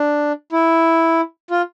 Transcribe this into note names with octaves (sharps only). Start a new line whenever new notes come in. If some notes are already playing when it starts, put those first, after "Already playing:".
Already playing: D4
E4
F4